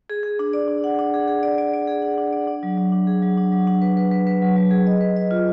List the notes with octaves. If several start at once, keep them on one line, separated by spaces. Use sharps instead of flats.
G#4
G#4
D4
D5
D4
F#5
D4
G#4
G#4
D5
D5
D5
G#4
F#5
D4
D5
D4
F#3
F#3
D4
G#4
F#3
D4
F#3
D4
B4
B4
B4
B4
F#3
F#3
G#4
D#5
B4
D#5
F4